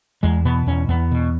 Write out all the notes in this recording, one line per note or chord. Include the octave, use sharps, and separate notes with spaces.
E2 G#3
B2 B3
E2 C#4
E2 B3
B2